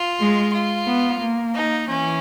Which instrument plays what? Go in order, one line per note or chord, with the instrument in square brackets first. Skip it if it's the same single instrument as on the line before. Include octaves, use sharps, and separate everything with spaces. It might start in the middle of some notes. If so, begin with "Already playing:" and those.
Already playing: [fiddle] F4
[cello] G#3
[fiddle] F4
[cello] B3
A#3
[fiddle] D#4
[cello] E3 [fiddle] C#4